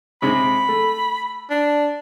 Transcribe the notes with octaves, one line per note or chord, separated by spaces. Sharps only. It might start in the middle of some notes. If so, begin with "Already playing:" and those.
C3 G#3 C4 B5
A3
D4